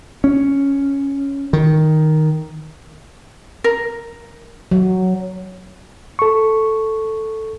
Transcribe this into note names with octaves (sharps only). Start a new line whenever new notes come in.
C#4
D#3
A#4
F#3
A4 C#6